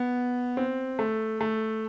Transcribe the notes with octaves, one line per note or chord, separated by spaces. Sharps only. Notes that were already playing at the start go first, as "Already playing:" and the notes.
Already playing: B3
C4
A3
A3